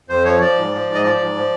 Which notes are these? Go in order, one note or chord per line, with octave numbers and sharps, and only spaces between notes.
F2 C5
F3 C#5
F3 D5
G#2
F3
G#2
D#5
F3 D5
G#2
F3